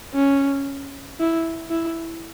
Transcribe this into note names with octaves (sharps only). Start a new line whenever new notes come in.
C#4
E4
E4